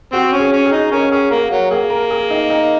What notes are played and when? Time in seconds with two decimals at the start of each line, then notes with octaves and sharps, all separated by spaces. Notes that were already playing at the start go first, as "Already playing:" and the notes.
0.13 C4 F#4
0.32 C#4
0.39 G#4
0.53 C#4
0.65 G#4
0.72 D#4
0.92 C#4 A#4
1.11 C#4 G#4
1.30 A#3 A#4
1.50 F#3
1.71 A#3 G#4
1.90 A#4
2.11 G#4
2.30 D#4
2.50 D#4